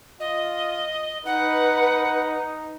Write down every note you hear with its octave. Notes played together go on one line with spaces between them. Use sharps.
F4 D#5
D#4 B4 F#5